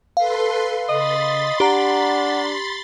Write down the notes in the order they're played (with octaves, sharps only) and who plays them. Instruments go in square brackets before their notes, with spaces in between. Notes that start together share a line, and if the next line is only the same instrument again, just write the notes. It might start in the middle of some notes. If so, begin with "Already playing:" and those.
[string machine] A4 B4 C6 [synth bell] F5
[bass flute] C#3 [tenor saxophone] D#5 [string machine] B5 C6 A6
[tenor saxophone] D4 [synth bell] G4 A#5 [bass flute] F#5